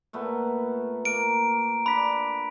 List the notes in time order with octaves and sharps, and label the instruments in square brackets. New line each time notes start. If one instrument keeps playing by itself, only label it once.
[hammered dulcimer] A#2 A3 B3
[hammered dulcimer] A#3 [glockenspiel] D7
[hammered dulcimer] D4 [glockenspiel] B5 B6